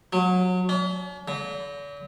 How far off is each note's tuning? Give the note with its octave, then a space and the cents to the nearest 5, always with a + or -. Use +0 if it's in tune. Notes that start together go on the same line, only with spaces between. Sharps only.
F#3 -25
C#4 +45
D3 -45